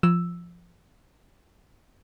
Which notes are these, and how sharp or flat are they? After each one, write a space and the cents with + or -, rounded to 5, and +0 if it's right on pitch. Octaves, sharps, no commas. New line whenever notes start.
F3 -10 E6 +0